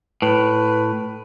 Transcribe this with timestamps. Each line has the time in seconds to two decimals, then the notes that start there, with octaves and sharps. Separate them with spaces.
0.22 A2 B4